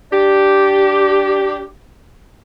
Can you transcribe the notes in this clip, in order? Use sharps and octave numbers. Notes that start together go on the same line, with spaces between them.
D4 G4